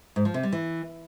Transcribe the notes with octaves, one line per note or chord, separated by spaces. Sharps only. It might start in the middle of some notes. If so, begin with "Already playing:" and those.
G#2
F3
C3
G3
E3